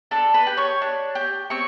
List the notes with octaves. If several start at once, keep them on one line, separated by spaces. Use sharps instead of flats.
D4 A4 A5
B4 B5
G4
C#5 C#6
D4
G4
C4 C#5 C#6